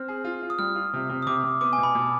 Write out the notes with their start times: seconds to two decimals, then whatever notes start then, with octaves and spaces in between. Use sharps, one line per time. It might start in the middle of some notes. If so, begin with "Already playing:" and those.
Already playing: C4 F6
0.08 G#4
0.24 F4
0.42 F4
0.50 D#6
0.59 G3 F6
0.75 F4
0.93 C3
1.09 C3
1.22 D#6
1.27 C3 D6
1.44 C3
1.61 B3 D6
1.73 G#5
1.78 B2
1.83 B5
1.95 B2